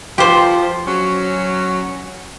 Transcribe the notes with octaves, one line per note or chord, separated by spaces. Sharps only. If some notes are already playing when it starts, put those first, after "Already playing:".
F3 G4 C5
F#3 C#4